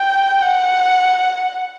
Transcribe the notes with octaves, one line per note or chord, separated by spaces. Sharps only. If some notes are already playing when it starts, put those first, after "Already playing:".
Already playing: G5
F#5